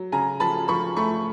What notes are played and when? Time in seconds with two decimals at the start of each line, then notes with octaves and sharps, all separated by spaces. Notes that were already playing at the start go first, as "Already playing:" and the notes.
Already playing: F#3
0.12 C#3 G#5 A#5
0.40 F3 A5 B5
0.68 F3 B5 C#6
0.96 A3 B5 C#6